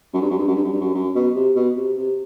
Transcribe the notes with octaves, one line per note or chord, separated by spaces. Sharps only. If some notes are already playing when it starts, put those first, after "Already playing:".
F#2
G2
F#2
G2
F#2
G2
F#2
G2
F#2
F#2
B2
C3
B2
C3
C3